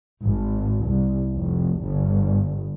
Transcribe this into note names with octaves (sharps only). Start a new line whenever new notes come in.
G#1
C2
F1
G1